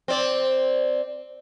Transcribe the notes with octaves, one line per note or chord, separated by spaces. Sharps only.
C4 D5